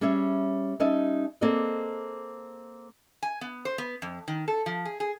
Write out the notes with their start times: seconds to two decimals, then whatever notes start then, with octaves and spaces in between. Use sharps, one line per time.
0.01 G3 C#4 G#4 C#5 E5
0.80 G3 C#4 D#4 D#5 E5 A5
1.41 A#3 C4 G#4 A4 D5 D#5
3.23 G#5
3.41 B3
3.65 C5
3.78 B3
4.02 F2
4.28 D#3
4.48 A4
4.66 F3
4.85 G#4
5.00 G#4